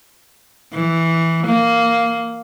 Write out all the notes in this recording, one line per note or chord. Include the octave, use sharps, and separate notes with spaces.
E3
A#3